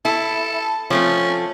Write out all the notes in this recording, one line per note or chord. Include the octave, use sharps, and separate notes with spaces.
E4 A4
F3 A3 C4 C#4